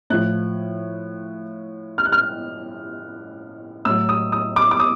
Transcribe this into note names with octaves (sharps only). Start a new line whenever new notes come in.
A2 F3 F#6
F6
F#6
F6
A2 F#3 E6
D#6
D#6
D6
D6
D#6